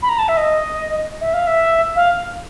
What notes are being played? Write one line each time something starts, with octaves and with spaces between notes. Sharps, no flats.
B5
A#5
A5
E5
D#5
E5
F5
E5
F5